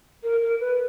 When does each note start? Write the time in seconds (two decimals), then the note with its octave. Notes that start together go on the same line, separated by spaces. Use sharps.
0.24 A#4
0.42 A#4
0.60 B4